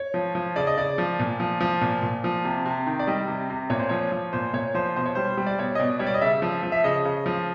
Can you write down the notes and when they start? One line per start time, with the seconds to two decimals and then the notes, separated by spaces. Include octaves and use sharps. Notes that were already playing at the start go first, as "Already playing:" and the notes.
Already playing: C#5
0.14 F3
0.35 F3
0.56 C#3 D5
0.67 D#5
0.77 C#3 D5
0.98 F3
1.19 A#2
1.40 F3
1.61 F3
1.81 A#2
2.02 A#2
2.24 F3
2.45 C3
2.65 C3
2.87 D#3
2.99 D5
3.07 G3 D#5
3.28 C3
3.50 C3
3.70 A#2 C#5
3.79 C5
3.89 F3 C#5
4.12 F3
4.33 A#2 C5
4.53 A#2 C#5
4.75 F3 C5
4.96 B2 C5
5.06 C#5
5.15 G3 C5
5.37 G3
5.47 D5
5.59 B2 C#5
5.75 D#5
5.79 B2 D5
5.99 G3 C#5
6.07 D5
6.14 D#5
6.21 C#3 E5
6.42 F3
6.63 F3
6.72 E5
6.84 C#3 D#5
7.05 C#3
7.26 F3